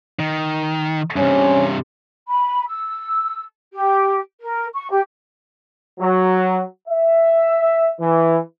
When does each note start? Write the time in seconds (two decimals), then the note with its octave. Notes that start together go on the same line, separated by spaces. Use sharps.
0.19 D#3
1.16 G2 C3 C#4
2.28 B5
2.68 E6
3.74 G4
4.40 A#4
4.74 C#6
4.91 G4
6.00 F#3
6.88 E5
8.00 E3